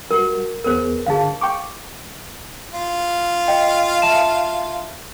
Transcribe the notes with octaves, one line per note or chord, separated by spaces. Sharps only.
G3 F#4 A#4
E2 B3 G#4 A#4 C5
G2 D3 G#4 F5 A5
G5 C#6 D6
F4
D#5 G5
E5 A5 E7